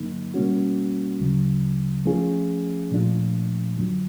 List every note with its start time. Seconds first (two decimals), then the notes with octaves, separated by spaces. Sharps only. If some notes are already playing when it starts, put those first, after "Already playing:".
Already playing: G2 D3 F#3 A#3 D#4
0.34 B2 G3 A#3 C#4 F#4
1.20 D2 C#3 F#3
2.05 F3 A3 C#4 F4 G#4
2.91 A#2 F3 A3 D4 F4
3.77 F#2 D3 F#3